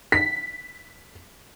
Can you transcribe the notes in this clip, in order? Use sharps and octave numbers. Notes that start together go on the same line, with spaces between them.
B6